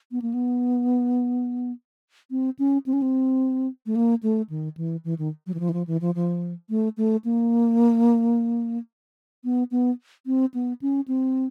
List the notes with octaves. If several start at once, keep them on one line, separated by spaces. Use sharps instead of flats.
B3
A#3
B3
C4
C#4
C4
C#4
C4
A3
A#3
A3
D#3
E3
E3
D#3
F#3
E3
F3
E3
F3
E3
F3
F3
A3
A3
A#3
B3
B3
C4
B3
C#4
C4